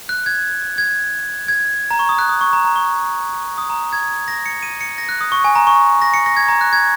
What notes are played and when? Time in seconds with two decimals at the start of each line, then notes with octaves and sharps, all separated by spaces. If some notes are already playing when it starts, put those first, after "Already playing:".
0.09 F#6
0.26 G#6
0.78 G#6
1.48 G#6
1.91 A#5
1.99 C#6
2.09 D#6
2.19 F#6
2.29 D#6
2.41 C#6
2.53 A#5
2.65 A#5
2.76 C#6
3.58 D#6
3.70 A#5
3.93 G#6
4.28 A#6
4.46 C#7
4.63 D#7
4.81 C#7
4.98 A#6
5.09 F#6
5.21 D#6
5.32 C#6
5.44 G#5
5.55 A#5
5.67 C#6
6.02 A#6
6.14 C#7
6.26 A#6
6.37 G#6
6.48 A#5
6.61 F#6
6.73 G#6